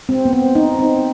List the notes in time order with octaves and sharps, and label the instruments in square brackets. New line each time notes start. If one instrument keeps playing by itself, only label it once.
[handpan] C4
B3
C4
D#4
C4